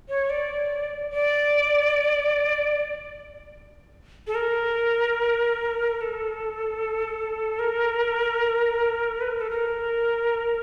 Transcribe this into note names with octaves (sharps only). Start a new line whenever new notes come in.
C#5
D5
D5
A4
A#4
A#4
A4
A#4
B4
A#4
A4
A#4